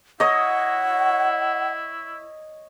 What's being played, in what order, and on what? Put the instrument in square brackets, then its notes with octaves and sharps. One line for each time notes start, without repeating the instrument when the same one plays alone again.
[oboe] E4 [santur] C#5 D#5 [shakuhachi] F#5